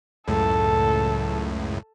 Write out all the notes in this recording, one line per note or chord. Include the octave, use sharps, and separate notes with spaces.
C#2 F#2 A2 A4